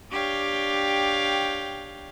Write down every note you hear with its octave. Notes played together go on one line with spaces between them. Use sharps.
D4 G4 C#5 F5 G5